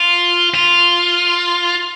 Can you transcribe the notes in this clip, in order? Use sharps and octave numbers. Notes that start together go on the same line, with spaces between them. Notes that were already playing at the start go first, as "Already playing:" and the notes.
Already playing: F4
F4